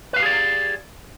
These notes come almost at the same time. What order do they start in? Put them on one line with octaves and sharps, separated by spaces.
B4 F5 G4 G#4 D5